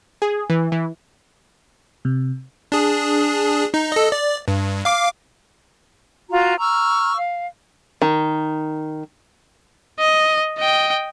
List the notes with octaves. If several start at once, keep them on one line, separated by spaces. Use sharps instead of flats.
G#4
E3
E3
C3
D4 G#4
D#4
A4 D#5
D5
G2
F5 D6
F4 F#4 A#5
A#5 C#6 E6 F6
F5
D#3
D#5
D#5 G5